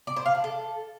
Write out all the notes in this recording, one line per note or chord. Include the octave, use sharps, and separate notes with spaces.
D5
C5
F5
D4
A4